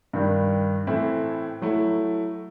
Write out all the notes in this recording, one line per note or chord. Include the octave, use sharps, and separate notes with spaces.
G2 D#3 G3
A2 E3 A3 C4 E4
F#3 A3 E4